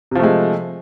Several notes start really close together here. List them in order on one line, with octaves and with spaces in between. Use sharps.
C3 F3 A3 G#3